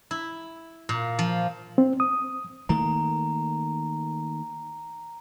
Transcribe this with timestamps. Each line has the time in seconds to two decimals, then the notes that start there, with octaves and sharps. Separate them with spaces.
0.11 E4
0.89 A#2
1.19 F3
1.78 C4
2.00 D#6
2.69 D#3 A3 A#3 A#5